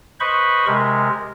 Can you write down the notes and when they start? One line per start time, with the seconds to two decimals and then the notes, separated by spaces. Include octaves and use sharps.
0.20 B4 C5 D#5 B5 C#6
0.67 C3 G#3 A#4